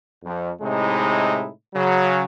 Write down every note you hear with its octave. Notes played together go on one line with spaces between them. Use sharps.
F2
A2 C3 G#3 D#4 E4
C#3 F#3